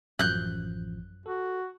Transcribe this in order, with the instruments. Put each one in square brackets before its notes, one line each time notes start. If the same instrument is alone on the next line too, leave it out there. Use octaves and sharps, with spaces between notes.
[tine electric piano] A1 F3 [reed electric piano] F#2 [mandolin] F#6 G6
[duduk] F#4 [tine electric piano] A4